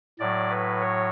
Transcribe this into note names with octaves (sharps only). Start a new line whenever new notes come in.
A2 F#3 D5
B4
C#5